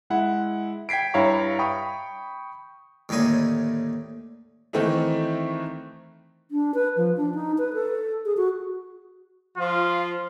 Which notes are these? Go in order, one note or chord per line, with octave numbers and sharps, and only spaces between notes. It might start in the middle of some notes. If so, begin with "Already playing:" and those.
G#3 E4 F#5
G5 G#6 B6 C7 D7
G2 E4 C#5 F5 A#5 C#6
G5 B5 C#6 D#6
D#2 A2 D3 D#4 G#5
D#3 E3 A3 C4 D#4 E4
D4
B4
F3
D4
D#4
B4
A4
G#4
F#4
F3 F4